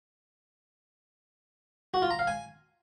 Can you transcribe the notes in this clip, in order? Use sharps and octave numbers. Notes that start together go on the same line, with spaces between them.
F#4
F4
A#5
F5
G#5